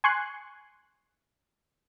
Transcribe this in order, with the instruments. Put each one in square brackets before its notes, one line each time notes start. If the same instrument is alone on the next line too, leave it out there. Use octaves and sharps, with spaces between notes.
[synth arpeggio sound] G#5 C6 C#6 F#6